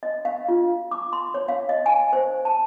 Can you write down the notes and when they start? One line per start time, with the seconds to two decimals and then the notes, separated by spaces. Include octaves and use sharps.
0.03 D#5
0.25 F5
0.48 F4
0.91 D6
1.13 C6
1.34 C#5
1.48 F5
1.69 D#5
1.86 G#5
2.13 C5
2.45 A5